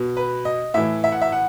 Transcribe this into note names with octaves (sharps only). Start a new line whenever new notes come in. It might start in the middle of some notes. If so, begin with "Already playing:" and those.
Already playing: B2
B4
D#5
A2 E3 E5
E5
F#5
E5
F#5